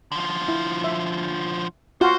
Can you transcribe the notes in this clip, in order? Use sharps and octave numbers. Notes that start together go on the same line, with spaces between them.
D3 F3
E4
E5
F4 F#4 C5 F5